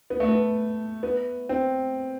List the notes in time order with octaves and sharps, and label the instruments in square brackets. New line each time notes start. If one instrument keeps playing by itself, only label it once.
[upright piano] B3
A3
B3
B3
C4